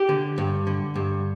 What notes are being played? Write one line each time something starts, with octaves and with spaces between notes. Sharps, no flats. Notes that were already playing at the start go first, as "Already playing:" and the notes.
Already playing: G4
D3
G2
D3
G2